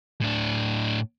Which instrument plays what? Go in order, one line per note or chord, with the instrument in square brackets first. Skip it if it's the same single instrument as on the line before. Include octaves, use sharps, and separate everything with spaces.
[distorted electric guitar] A2 D4